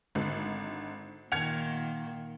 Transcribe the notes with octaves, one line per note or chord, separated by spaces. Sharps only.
G#1 D3
A#2 D#3 F#5 G#6 C#7 F7